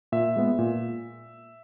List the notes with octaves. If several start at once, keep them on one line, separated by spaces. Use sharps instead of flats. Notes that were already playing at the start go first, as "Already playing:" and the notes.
A#2 E5
G#3 B3
A#2